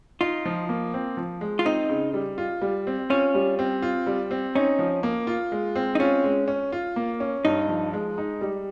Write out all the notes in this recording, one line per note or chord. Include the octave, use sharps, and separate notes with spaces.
D#4 F4
F3
A#3
C4
F3
G#3
F4
C4 D#4
C#3
G3
F4
G3
C4
C#4 F4
G3
C4
F4
G3
C4
C#4 D#4
F3
A#3
F4
G#3
C4
D#4
C#4 F4
G#3
C#4
F4
A#3
C#4
G2 D#4
F3
G#3
D#4
G3